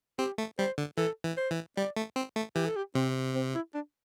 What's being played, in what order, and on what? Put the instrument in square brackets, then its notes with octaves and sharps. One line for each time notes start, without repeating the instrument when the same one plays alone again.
[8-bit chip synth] C4 [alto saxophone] G4
[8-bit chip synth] A3
[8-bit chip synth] G3 [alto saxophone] C5
[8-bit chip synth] D3
[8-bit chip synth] E3 [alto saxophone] A4
[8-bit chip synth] E3
[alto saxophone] C5
[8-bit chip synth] E3
[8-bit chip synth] G3 [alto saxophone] D5
[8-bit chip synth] A3
C4
A3
[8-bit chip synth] E3 [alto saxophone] G4
[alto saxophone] A4
G4
[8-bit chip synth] C3 [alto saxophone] C4
[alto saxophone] C4
E4
D4